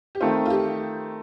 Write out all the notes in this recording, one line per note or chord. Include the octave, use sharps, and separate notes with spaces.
G4
D#3 A3 C4 F4
F4
G4